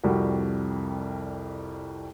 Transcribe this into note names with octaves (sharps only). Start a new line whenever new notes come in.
C2 F2 G3 F#4